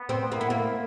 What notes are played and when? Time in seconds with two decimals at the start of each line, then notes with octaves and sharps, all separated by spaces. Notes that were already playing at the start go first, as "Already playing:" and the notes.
Already playing: B3
0.09 C4
0.31 A#3 E4
0.41 B3
0.50 A#3